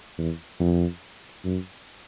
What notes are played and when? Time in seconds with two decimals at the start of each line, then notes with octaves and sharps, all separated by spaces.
0.18 E2
0.60 F2
1.45 F#2